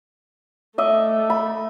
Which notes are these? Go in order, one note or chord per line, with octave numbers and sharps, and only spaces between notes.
A3 D#5 E5 D6
B5